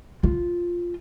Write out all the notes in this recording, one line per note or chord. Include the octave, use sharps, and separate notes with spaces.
F4